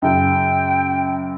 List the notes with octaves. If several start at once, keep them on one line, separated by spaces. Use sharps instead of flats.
F#2 C#3 G5